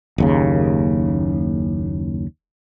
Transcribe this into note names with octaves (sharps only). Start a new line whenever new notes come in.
F#1 D#2 C#3